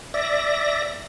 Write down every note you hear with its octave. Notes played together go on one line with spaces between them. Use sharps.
D5 E5 A#6